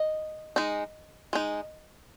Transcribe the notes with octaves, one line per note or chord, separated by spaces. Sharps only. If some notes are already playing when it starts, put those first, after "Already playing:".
Already playing: D#5
G#3 D#4
G#3 D#4